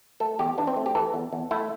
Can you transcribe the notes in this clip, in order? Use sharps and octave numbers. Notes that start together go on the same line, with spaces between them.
A3 A4
E2 G4
E3 D4
C4
A3
G4
E3 A4
E2
E2
A3 E4